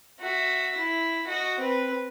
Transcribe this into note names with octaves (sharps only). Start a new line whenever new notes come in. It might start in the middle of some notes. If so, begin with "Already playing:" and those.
F#4 E5
E4
F#4 D#5
C4 B4